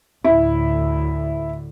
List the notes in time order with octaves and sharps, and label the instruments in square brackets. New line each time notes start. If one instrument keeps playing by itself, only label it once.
[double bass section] D2 A2 D3 [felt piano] E4